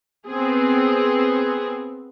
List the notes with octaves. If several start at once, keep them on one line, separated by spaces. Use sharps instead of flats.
B3 C4 G#4